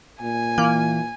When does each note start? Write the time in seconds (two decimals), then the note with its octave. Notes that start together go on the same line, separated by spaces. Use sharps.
0.21 A#2 G#5
0.58 E3 A#3